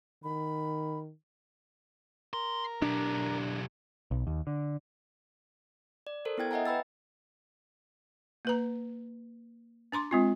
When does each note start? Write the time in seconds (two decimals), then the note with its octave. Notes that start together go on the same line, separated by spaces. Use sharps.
0.24 D#3 B5
2.33 A#4 C6
2.82 B1 D4 G4
4.11 B1
4.27 D#2
4.47 D3
6.07 D5
6.25 A4 A#4 C5
6.38 B3 E4 G5 G#6
6.51 D#5 E5 F#5 G#5 A#5
6.66 B4 G5 B5 E6 A6
8.45 A#3 B4 A#5
9.92 D4 A#5 C6 D6
10.11 G#3 C4 F4